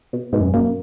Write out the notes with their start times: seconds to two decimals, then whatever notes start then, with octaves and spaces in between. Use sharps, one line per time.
0.13 B2
0.32 G#2 B2
0.40 F#2
0.54 F#2 A#3